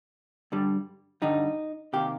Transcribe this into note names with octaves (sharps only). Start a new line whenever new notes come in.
G2 D3 G3
G2 D3 G3 D#4
C3 D#3 A#3 G4